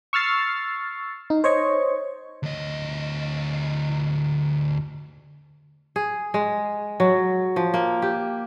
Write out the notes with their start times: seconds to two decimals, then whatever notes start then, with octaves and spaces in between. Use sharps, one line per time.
0.13 C#6 E6 F6 A6 C7
1.30 D#4
1.44 C5 C#5 D#5 C#6
2.43 D2 D#5
5.96 G#4
6.34 G#3
7.00 F#3
7.56 F3
7.74 A#3
8.02 G4